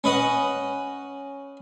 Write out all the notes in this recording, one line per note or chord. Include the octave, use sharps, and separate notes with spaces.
C#4 B4 D#5 F#5